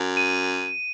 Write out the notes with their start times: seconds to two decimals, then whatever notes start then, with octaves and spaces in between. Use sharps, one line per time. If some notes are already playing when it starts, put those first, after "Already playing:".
Already playing: F#2
0.17 D#7